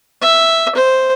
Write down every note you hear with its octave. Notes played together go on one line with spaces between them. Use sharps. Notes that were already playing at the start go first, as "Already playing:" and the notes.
E5
C5